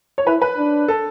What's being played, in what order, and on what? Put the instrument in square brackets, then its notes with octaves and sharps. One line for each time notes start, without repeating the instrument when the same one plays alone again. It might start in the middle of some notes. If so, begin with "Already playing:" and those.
[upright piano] C#5
[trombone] E4 [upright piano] B4
[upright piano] B4
[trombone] D4
[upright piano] A4